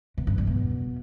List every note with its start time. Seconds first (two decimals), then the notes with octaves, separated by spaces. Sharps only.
0.17 B2
0.27 G2
0.38 G2
0.47 B2